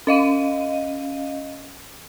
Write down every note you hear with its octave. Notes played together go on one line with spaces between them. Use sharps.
C#4 D#5 F5 D#7